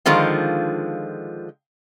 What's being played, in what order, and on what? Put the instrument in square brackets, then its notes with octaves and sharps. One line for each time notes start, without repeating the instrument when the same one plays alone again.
[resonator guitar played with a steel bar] D3 D#3 F3 G#3 F4